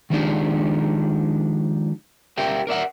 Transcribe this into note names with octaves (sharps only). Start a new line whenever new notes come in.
D#3 F3 G#3 D4 D#4 G4
G4 A#4 E5 G5
A#4 D5 E5 F#5